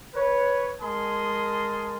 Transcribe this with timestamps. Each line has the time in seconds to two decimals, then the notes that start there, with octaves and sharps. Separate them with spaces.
0.15 B4 C#5
0.81 G#3 A#4 G#5 A5 C6 D#6